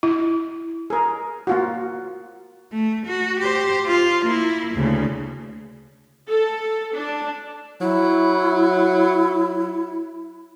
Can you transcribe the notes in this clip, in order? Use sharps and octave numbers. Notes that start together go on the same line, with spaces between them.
E4
G#4 A#4
A#3 F4 F#4
A3
F#4
G4 C5
F4
A#3 E4
D2 C#3
A4
D4
F#3 E4